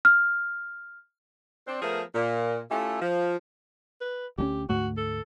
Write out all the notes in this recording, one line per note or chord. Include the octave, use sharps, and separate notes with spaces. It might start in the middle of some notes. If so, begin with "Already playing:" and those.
F6
C4 D4
F3 A3 B3 G#4 A#4
A#2
A3 C#4 E4 F4 G4 A4
F3
B4
D2 G#3 C#4 G4
D2 G#2 A3 F#4
A4